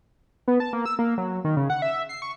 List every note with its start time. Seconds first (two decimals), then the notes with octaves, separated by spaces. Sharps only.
0.48 B3
0.60 A5
0.73 A#3
0.86 E6
0.99 A#3
1.18 F#3
1.45 D#3
1.57 C#3
1.70 F#5
1.82 E5
2.09 C7
2.22 C#6